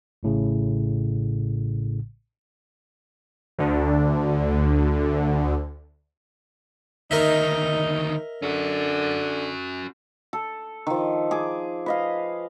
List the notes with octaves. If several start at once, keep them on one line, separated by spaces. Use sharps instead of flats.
A1 A2 C#3
D2 D3
D2 D#3 D#4 A#4 D#5 E5
D3 C#4 F#4
A4
D#3 F3
G#4 D6
B4 D#5 F5